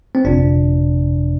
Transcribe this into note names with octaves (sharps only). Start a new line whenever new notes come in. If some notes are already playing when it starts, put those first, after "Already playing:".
C4
G1 F2 C3 D4